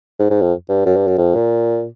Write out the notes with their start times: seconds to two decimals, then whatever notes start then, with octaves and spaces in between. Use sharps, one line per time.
0.20 G#2
0.30 G#2
0.42 F2
0.69 G2
0.86 F#2
0.96 G2
1.07 F#2
1.18 F2
1.35 A#2